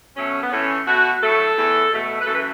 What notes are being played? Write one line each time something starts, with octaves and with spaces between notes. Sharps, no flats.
B2 F#3 A3 C#4
B3
A2 E3 A3 C#4
B2 A3 F#4
A2 F#3 A3 A4
E2 E3 A3
B2 A3
B4
F#2 E3 A3 A4
B4